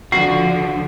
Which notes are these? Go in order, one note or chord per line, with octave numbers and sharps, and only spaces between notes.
C#2 D3 F3 F#4 C7